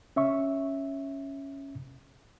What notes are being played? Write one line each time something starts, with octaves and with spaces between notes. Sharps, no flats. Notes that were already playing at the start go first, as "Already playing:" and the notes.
C#4 E5 C#6